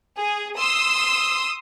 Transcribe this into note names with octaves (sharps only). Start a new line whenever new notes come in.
G#4
C6 D#6 E6